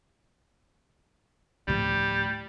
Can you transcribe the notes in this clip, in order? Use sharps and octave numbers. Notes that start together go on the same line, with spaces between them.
D2 A2 F3 G3